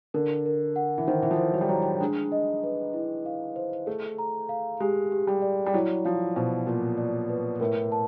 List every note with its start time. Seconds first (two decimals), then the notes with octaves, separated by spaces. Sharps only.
0.14 D3 A#4
0.46 A#4
0.76 F#5
0.98 E3
1.07 D#3 C5
1.22 E3
1.31 F3
1.38 C5
1.53 F#3
1.61 G3
1.69 F#3 A#5
2.01 G#3 D4
2.32 D#5
2.63 B4
2.94 E4
3.26 F5
3.56 C5
3.87 A3 G#4
4.18 A#5
4.49 F5
4.80 G#3 G4
5.12 G4
5.27 G3
5.42 D5
5.66 G3
5.73 F#3 E4
6.05 F3 F5
6.36 B2 C5
6.67 A#2 F4
6.98 D5
7.29 B4
7.60 A2 A#4
7.92 A5